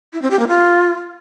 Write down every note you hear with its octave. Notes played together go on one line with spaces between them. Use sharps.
E4
C4
G4
A#3
F4